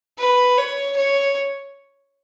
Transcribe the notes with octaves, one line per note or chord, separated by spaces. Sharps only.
B4
C#5
C#5